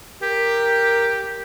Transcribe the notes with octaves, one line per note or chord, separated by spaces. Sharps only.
G4 A#4